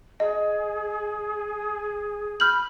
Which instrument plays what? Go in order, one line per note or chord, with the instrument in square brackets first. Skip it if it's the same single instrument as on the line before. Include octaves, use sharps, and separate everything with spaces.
[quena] G#4 [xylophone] D#5
[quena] B5 [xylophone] F6 G6 F#7